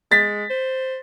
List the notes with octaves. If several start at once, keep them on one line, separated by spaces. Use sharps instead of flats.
G#3 A6 B6
C5